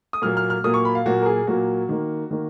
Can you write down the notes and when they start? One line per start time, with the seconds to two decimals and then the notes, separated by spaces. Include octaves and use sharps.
0.13 D#6
0.22 A#2 F#3 A#3 F6
0.37 F6
0.50 F6
0.64 A#2 F#3 A#3 D#6
0.74 C#6
0.85 B5
0.95 F5
1.06 A#2 F#3 A#3 F#4
1.22 A#4
1.26 G#4
1.47 A#2 F#3 A#3 F#4
1.89 D#3 A#3
2.31 D#3 A#3